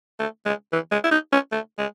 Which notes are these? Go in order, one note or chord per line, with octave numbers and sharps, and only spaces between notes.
A3
G#3
E3
G#3
E4
D#4
C#4
A3
G#3